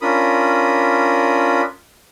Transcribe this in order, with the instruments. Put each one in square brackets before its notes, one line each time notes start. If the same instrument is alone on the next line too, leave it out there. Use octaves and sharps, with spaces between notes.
[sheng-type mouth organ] C#4 D4 F4 A#4 B5 D#6